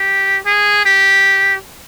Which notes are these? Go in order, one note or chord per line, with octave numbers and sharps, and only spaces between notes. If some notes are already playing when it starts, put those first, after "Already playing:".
Already playing: G4
G#4
G4